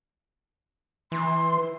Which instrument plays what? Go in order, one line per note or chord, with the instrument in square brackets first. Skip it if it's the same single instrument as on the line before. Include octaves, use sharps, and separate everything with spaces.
[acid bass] E3 [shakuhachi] C6